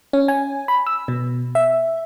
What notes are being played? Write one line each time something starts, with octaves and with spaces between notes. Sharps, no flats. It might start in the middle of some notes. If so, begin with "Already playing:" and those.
C#4
G#5
B5
E6
B2
E5